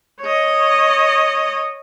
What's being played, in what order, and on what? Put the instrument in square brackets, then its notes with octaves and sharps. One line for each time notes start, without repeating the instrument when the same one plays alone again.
[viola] C#5 D#5